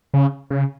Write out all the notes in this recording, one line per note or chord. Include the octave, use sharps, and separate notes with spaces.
C#3
C#3